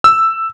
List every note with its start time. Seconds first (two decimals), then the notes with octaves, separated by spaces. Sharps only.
0.04 E6